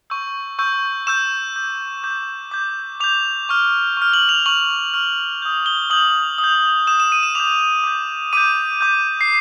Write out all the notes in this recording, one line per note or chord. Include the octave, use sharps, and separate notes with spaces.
C#6 E6 G6
C#6 E6 G6
C#6 E6 G6 E7
D6 G6
D6 G6
D6 G6
D6 G6 F7
C#6 F6
C#6 F6
F#7
F7
C#6 F6 F#7
C#6 F6
D#6 G6
G7
D#6 G6 F#7
D#6
G6
D#6 G6 E7
E7
D#7
E7
D6 G6 F7
D6 G6
D6 G6 D#7
D6 G6
C7